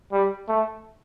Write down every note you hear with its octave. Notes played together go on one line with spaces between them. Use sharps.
G3
A3